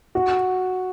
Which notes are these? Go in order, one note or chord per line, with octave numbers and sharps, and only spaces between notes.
F#4